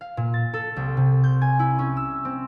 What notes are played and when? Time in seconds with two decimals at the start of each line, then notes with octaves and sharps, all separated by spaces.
0.01 F5
0.17 A#2
0.34 A6
0.54 A4
0.76 C2
0.97 C3
1.24 G6
1.41 G#5
1.59 E4
1.79 C#4
1.97 E6
2.25 C4